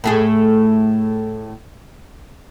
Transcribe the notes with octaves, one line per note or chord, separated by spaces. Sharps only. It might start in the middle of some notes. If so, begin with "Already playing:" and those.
A2 A3 G#4